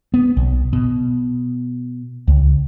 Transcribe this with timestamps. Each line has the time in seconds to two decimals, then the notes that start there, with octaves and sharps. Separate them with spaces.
0.14 B3
0.37 B1
0.73 B2
2.28 C#2